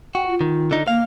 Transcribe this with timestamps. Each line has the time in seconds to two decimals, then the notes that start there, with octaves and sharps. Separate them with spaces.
0.15 F#4 G5
0.28 F4
0.41 D#3
0.71 D3 D#4
0.88 A#3 F5